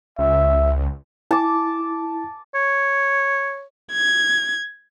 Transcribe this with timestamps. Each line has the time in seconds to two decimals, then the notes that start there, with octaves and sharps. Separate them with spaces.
0.19 C#2 E5
1.31 E4 A5 D6
2.55 C#5
3.93 G#6